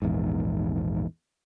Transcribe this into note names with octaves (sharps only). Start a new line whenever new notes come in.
A#1 E2 G#2